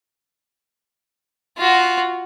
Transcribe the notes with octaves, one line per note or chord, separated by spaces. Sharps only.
F4 F#4